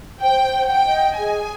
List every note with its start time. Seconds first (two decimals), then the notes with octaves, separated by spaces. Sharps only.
0.23 C5 G5
0.55 F#5
0.70 G5
0.86 D#5
1.17 G#4 G#5